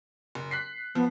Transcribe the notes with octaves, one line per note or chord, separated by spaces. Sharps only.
F#1
F#6 B6 C7
F3 B3